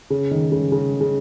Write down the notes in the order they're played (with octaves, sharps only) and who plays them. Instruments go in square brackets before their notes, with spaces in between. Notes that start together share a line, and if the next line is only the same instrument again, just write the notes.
[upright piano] C#3
D#3
C#3
C#3
C#3